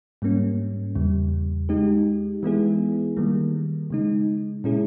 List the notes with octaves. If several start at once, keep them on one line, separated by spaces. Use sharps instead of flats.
G#2 G3 A#3 C#4
E2 C#3 G3
G#3 D#4 G4
E3 G#3 B3 E4 G#4
D#3 G3 A#3
C#3 G#3 D#4
A#2 G#3 C#4 E4 G#4